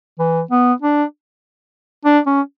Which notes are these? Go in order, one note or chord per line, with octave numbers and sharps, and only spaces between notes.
E3
B3
D4
D4
C#4